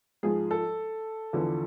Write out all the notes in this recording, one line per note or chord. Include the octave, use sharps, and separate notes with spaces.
G#2 F3 G#4
A4
E2 D3 F3